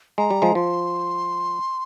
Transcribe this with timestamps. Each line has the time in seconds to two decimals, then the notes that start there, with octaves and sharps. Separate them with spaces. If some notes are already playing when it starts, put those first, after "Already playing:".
0.18 G#3 A#5
0.30 G3
0.42 F3 G#3
0.55 F3 C6